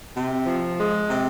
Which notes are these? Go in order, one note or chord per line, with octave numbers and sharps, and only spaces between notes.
C3
F3
G#3
C3